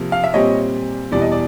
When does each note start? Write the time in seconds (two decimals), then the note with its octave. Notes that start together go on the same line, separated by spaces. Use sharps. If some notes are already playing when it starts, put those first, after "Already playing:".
Already playing: C3 F3 A#3
0.12 F5
0.24 E5
0.34 A#2 G3 C4 C#5 D#5
1.12 E2 B2 G3 D5
1.22 D#5
1.31 D5